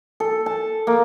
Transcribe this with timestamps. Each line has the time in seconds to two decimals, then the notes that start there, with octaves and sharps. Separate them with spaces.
0.20 A4
0.46 A5
0.87 A#3